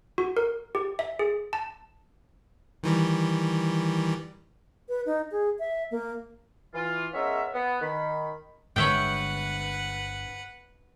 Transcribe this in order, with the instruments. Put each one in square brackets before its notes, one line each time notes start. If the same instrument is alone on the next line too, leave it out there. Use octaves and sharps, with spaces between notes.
[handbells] F#4
A#4
G4
E5
G#4
A5
[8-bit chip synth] D#3 E3 G3
[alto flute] B4
D#4
G#4
E5
A#3
[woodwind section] E3 F4
G#3 B3 C#4 A#4 E5
B3
D#3 B5
[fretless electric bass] G1 D3 G#3 [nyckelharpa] B4 F#5 [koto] C#5 E5 G5